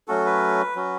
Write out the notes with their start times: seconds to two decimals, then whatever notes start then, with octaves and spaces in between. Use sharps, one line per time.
0.08 F#3 A3 C#4 F#4 A4
0.26 B4
0.75 F#3 C#4 F#4